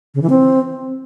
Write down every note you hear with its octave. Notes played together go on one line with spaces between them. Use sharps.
C#3
E3
C4